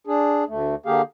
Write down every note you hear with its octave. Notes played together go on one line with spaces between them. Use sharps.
D4 G#4
D2 A3
D3 A#3 G4 G#4 F5